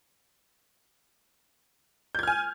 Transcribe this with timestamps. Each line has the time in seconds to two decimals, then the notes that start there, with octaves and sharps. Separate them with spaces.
2.15 G6
2.19 G#6
2.23 F6
2.28 G#5